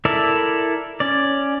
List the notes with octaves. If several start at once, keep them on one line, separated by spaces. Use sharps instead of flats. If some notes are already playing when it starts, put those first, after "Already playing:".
E4 A4 A#4 D5 E5
C#4 D5